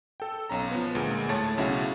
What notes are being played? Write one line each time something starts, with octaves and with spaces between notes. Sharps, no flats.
A4 G5
B1 C#4 A#5
F3 B3
D2 A#2 G#3
A2 A3 C#5 A5 A6
B1 C#3 C#4 E4 F#4